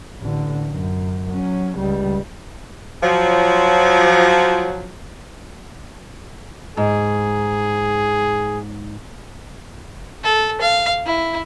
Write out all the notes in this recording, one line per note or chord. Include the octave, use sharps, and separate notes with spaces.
A1 D3
F#2
F#3 C#4
C#2 G3
F3 F#3
G#2 G#4
A4
F5
E4